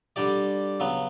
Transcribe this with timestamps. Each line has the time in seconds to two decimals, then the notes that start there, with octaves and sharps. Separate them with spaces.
0.16 D3 G3 D4 G4 D5
0.80 C#3 F#3 B3